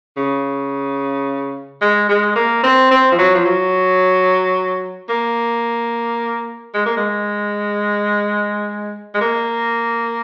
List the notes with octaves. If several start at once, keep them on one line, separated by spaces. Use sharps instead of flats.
C#3
G#3
G#3
A#3
C4
C4
F3
F#3
F3
F#3
A#3
G#3
A#3
G#3
G#3
A#3